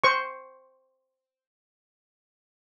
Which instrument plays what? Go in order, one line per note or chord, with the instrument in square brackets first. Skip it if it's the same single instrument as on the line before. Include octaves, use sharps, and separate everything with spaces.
[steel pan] C5 C#6